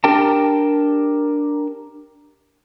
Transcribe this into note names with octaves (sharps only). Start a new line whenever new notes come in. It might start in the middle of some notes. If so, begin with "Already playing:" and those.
D4 G4 A#4 G5 A5